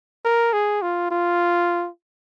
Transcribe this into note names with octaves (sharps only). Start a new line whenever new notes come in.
A#4
G#4
F4
F4